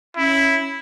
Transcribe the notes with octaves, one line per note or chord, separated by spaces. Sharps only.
C#4 E4